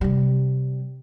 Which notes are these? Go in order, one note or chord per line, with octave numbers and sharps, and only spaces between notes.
C3 G3